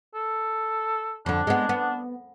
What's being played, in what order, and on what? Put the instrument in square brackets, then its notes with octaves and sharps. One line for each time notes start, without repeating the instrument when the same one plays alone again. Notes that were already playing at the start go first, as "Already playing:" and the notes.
[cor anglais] A4
[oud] F2 D3 [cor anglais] D4
[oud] G#3 B3
B3